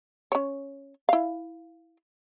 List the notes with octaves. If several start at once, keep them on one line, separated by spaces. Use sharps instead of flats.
C#4 C#5
E4 F5